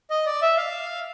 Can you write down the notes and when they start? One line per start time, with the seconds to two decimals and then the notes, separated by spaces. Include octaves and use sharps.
0.11 D#5
0.26 D5
0.42 E5
0.57 F5